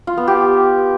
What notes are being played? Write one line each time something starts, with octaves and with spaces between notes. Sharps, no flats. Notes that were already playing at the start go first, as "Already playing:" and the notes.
F4
B3
G4